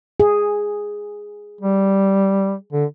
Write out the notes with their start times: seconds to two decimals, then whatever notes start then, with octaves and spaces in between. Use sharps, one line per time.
0.20 G#4
1.61 G3
2.73 D3